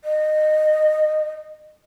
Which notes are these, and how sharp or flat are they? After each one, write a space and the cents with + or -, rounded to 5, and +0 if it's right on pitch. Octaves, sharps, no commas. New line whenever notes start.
D#5 -20